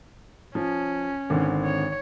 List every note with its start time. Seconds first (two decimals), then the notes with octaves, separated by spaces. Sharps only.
0.55 F3 C#4
1.30 G#1 D3 C4
1.64 C#5